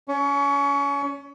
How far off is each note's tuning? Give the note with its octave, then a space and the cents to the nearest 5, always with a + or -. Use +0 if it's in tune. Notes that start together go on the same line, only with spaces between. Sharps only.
C#4 +30 C#6 +0